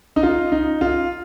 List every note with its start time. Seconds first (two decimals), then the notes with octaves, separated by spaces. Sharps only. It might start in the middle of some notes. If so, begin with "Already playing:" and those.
0.16 D#4
0.23 F4
0.52 D#4
0.81 F4